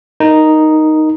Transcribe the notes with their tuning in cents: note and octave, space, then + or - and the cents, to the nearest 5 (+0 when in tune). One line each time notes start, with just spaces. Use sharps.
D#4 +0 A#4 +0